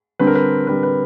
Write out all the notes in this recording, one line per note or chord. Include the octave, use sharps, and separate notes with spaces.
D3 G3 C4 B4
A#4
B4
D3 G3 C4 B4
B4